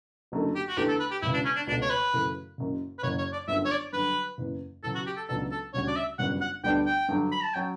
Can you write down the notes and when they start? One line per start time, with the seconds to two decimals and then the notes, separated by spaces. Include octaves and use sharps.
0.32 F#1 F#2 D3 A3
0.55 G4
0.68 F#4
0.77 E2 D3 A3 G4
0.89 A4
1.00 B4
1.11 G4
1.22 E1 E2 C#3 E4
1.34 D4
1.45 C#4
1.56 D4
1.67 C#2 B2 A3 D4
1.82 C#5
1.90 B4
2.13 F#2 C#3 E3 A3
2.58 F#1 F#2 C#3
2.99 B4
3.03 F#1 F#2 C#3 F#3 C#4 C#5
3.18 C#5
3.33 D5
3.48 G1 F#2 D3 E5
3.66 C#5
3.71 D5
3.93 G2 D3 F#3 B4
4.38 F#1 E2 C#3
4.83 E2 C#3 F#3 A4
4.95 F#4
5.06 G4
5.17 A4
5.28 C#2 C#3 F#3 B3 D4 A4
5.51 A4
5.74 D2 C#3 G3 C#4 F#4 C#5
5.88 D5
5.96 E5
6.19 G1 F#2 C#3 G3 C#4 F#5
6.41 F#5
6.63 D2 D3 G3 B3 D4 G5
6.86 G5
7.09 G2 D3 F#3
7.32 B5
7.43 A5
7.54 F#3 C#4 F#4 G5